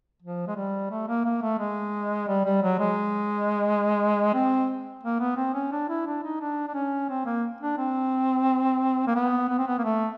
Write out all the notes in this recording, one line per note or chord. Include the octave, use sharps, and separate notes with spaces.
F3
G#3
G3
A3
A#3
A#3
A3
G#3
G3
G3
F#3
G#3
C4
A#3
B3
C4
C#4
D4
E4
D4
D#4
D4
D4
C#4
C4
A#3
D4
C4
A#3
B3
B3
C4
B3
A#3
A3